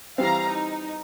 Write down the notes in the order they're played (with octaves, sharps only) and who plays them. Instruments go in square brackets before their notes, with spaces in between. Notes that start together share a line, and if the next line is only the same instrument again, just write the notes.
[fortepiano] E3 G3 C4 [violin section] F5 A#5
[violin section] D#4